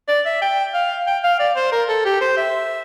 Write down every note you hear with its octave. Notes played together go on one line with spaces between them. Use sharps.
D5
E5
G5
F5
G5
F5
D5
C5
A#4
A4
G4
C5
E5